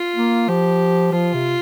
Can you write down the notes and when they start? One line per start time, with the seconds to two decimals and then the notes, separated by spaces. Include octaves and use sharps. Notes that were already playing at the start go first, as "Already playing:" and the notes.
Already playing: F4
0.16 A#3
0.48 F3 G4
1.12 F3 F4
1.34 C3